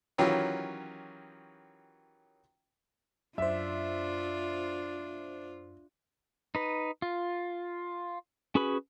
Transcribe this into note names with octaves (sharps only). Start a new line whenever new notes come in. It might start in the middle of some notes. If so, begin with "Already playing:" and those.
D#3 E3 F#3 C#4 F4 G4
F#2 D4 F4 C5 E5
D#4 B4
F4
C#4 F#4 G#4 B4 B5